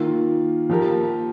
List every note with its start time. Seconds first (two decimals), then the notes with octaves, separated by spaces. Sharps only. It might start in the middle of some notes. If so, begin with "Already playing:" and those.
Already playing: D#3 A#3 F4
0.69 F3 A#3 G4 A#4